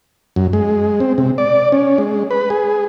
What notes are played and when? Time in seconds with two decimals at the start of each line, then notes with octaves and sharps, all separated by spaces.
0.36 F#2
0.53 G#3
1.00 C4
1.18 C3
1.38 D5
1.72 C#4
1.98 G#3
2.31 B4
2.50 G#4